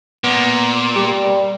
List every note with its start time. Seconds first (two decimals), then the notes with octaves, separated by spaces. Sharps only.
0.24 A#2 B3
0.96 G3 G4